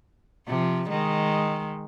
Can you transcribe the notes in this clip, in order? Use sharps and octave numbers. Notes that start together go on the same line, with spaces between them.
C3 F3
D#3 G#3